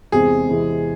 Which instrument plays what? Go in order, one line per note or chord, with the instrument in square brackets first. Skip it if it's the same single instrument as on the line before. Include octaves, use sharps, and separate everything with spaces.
[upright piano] E2 C3 E3 G#3 C4 [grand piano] G#4
[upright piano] E2 C3 E3 G#3 C4